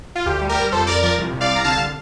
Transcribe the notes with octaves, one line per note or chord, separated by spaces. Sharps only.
F4
D2 G4
G3
G4 A#4
G3
F2 A4 C5
F2 A#4 D5
F3 A#4 D5
C2
C3
D5 F5
C2
A#5
D3 F5 A5